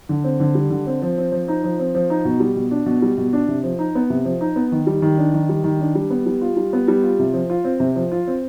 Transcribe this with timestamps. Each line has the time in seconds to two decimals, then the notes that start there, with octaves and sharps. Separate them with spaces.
0.09 D3
0.24 C4
0.40 D3
0.55 G3
0.70 D3
0.87 C4
1.02 F3
1.18 C4
1.32 F3
1.48 D#4
1.64 F3
1.79 C4
1.95 F3
2.10 D#4
2.25 B2
2.40 G3
2.56 B2
2.71 D4
2.86 B2
3.02 G3
3.18 B2
3.33 D4
3.48 C3
3.64 F3
3.79 D#4
3.95 B3
4.10 C3
4.25 F3
4.41 D#4
4.56 B3
4.72 D#3
4.87 G3
5.02 D#3
5.18 D4
5.34 D#3
5.49 G3
5.64 D#3
5.80 D4
5.95 G3
6.10 B3
6.26 G3
6.41 F4
6.57 G3
6.73 B3
6.88 G3
7.03 F4
7.19 C3
7.34 F3
7.50 F4
7.64 C4
7.80 C3
7.96 F3
8.12 F4
8.27 C4